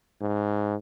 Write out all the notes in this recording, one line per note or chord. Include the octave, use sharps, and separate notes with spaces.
G#2